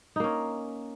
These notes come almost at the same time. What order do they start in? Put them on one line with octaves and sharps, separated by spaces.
D#4 A#3 C#4